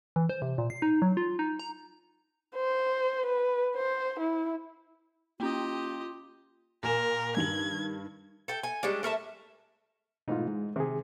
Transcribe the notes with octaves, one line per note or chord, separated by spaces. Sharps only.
E3
C5
C3
A#2
C7
D#4
F#3
F4
D#4
A#5
C5
B4
C5
E4
A#3 C#4 F4 G4 D#5
A#2 A#4 G#5 E7
G2 D#3 G#6 F#7
A4 G5
G#5
G3 G#3 C#4 D4
A3 A#4 E5 A5
G#2 B2 E3 A3 D#4 F4
G#3
C3 D#3 C4 G#4